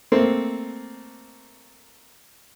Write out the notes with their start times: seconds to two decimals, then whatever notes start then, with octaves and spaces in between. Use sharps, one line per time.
0.12 A3 A#3 C4